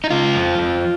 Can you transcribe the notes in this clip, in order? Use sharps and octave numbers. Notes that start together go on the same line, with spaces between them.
D#4
C#3 F4
F2
F2